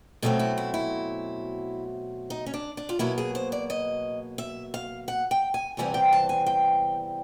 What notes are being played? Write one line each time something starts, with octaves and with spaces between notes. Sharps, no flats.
B2 F#3 A3 C4 D#4
E4
E4
E4
D#4
C#4
D4
D4
F4
B2 F#3 A#3 E4
G#4
C5
D5
D#5
E5
F5
F#5
G5
G#5
E2 C3 E3 G3 C4 G#5
G5
A5
G#5
G5